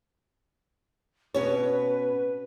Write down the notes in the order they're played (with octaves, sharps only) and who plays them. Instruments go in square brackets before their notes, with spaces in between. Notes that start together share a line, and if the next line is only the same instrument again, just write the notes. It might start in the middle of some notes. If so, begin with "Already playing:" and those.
[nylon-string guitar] B2 C#4 C#5 [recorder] B4